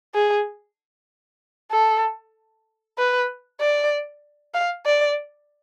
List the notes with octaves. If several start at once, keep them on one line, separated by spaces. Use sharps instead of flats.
G#4
A4
B4
D5
F5
D5